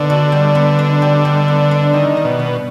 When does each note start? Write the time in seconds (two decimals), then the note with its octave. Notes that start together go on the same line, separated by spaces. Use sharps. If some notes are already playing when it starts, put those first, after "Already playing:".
Already playing: D3 B3 D4
0.10 F#4
0.32 G3
0.55 B3
0.79 D4
1.02 G4
1.25 G3
1.48 B3
1.71 D4
1.93 D#3 G4
2.17 G3
2.25 B2
2.39 B3